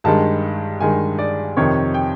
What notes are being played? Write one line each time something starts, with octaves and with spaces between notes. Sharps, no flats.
G2 D#3 G#3 A5
G2 D#3 G#3 G#5
D5
F2 C3 D#3 C#5
G5